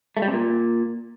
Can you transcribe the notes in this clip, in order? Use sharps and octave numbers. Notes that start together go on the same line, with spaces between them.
A3
G3
C3
A#2